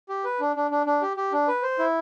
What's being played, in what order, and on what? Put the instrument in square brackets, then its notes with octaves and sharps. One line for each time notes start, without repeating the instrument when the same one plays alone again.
[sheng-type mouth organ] G4
B4
D4
D4
D4
D4
G4
G4
D4
B4
C5
E4